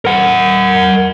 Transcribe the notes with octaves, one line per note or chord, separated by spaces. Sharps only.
A#4 F#5